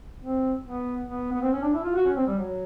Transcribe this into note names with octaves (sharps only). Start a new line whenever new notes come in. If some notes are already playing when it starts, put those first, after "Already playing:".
C4
B3
B3
B3
C4
C#4
D4
E4
F4
F#4
C#4
C4
G3
F#3